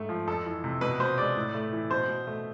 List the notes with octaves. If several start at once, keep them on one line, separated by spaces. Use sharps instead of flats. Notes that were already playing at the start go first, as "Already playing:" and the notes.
Already playing: G#2 A3
F3
F2 A4
E3
C3
B2 B4
B2 C5
G#3 D5
A2
A3
E3
B2 C5
B2
A3